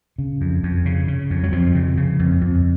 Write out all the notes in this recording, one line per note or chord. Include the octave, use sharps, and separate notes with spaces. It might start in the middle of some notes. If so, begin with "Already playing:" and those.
C#3
F2
F2
C#3
C#3
F2
F#3
F2 F3
C#3
C#3
F2
F2